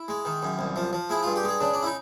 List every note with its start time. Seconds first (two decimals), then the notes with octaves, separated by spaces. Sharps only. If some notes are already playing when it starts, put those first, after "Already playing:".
Already playing: E4
0.08 G#3
0.25 D#3
0.43 F#2
0.59 C2
0.76 F3
0.93 F3
1.10 G#3 E4
1.23 G2 F4
1.36 G4
1.43 G#3
1.49 G#4
1.60 C#3 D4
1.74 D4
1.82 E4
1.86 D#4